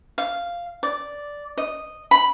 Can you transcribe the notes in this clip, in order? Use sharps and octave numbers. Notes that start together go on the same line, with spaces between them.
F5
D5
D#5
B5